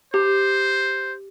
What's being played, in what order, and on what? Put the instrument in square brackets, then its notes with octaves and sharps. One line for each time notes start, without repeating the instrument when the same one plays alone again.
[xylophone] G4 [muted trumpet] C5